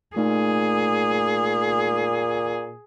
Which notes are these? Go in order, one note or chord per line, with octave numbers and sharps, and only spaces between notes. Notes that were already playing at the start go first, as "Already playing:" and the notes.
A#2 A3 D#4 G#4